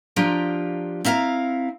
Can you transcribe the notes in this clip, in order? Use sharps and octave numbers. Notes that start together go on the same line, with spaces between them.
F3 D4 F4 G4 A#5
C4 E4 F5 A5 A#5